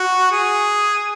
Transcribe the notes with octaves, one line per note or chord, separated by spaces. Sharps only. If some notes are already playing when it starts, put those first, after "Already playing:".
Already playing: F#4
G#4